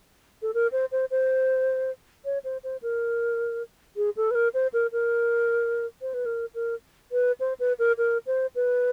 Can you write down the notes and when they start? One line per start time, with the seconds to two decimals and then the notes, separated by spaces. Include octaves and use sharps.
0.42 A4
0.54 A#4
0.72 C5
0.92 C5
1.11 C5
2.25 C#5
2.44 C5
2.64 C5
2.82 A#4
3.97 G#4
4.17 A4
4.31 B4
4.35 A#4
4.54 C5
4.73 A#4
4.92 A#4
6.01 C5
6.14 B4
6.26 A#4
6.55 A#4
7.12 B4
7.40 C5
7.60 B4
7.79 A#4
7.98 A#4
8.26 C5
8.55 B4